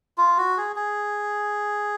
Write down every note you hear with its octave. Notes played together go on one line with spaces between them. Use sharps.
F4
F#4
G#4
G#4